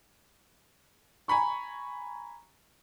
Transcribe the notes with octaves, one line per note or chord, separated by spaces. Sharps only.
G#5 A#5 B5 C#6